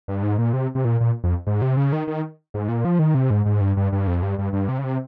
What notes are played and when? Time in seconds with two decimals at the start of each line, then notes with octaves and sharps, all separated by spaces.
0.08 G2
0.23 G#2
0.38 A#2
0.53 C3
0.75 C3
0.85 A#2
1.00 A#2
1.24 F2
1.47 G#2
1.62 C3
1.77 C#3
1.92 D#3
2.07 D#3
2.54 G#2
2.68 A#2
2.85 F3
2.99 D#3
3.14 C3
3.30 G#2
3.45 G#2
3.61 G2
3.77 G2
3.92 G2
4.07 F2
4.23 G2
4.38 G2
4.53 G2
4.69 C3
4.79 C#3
4.84 C3